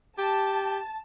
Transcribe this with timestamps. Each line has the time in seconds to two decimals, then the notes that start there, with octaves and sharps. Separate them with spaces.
0.18 G4 A5